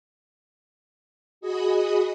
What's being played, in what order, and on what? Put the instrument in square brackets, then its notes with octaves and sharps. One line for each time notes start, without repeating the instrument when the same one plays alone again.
[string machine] F#4 G#4 D#5 B5 D#6